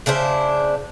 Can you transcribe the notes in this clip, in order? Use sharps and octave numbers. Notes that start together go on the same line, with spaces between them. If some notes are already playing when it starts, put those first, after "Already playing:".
C#3 D4 E4 C5